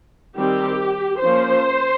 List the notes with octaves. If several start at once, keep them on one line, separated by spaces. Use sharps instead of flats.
D#3 G3 C4 G4
F3 A#3 C#4 C5